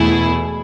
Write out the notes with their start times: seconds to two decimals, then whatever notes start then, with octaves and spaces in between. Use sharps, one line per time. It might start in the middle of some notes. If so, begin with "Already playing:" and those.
Already playing: E2 B2 A3 E4 G#4